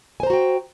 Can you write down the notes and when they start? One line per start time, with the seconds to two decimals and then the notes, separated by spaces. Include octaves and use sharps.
0.20 G#5
0.23 C5
0.27 A#5
0.30 F#4
0.33 G5